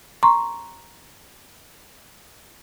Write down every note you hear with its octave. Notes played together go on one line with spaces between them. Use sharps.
A#5 C6 C#6